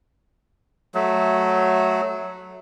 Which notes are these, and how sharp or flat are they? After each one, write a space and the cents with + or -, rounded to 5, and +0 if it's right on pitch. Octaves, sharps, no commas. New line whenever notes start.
F#3 +0 A3 -10